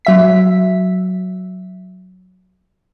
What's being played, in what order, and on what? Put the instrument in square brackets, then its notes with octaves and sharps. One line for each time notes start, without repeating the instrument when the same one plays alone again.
[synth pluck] F#3 E5 B6